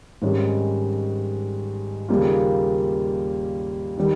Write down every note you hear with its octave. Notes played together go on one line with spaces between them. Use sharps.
G#1 G#2 G3 C#4
D#2 C#3 G3 A#3 F4
D#3 G3